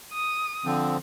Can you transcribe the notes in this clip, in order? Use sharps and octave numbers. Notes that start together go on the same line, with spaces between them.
D#6
D3 F3 C4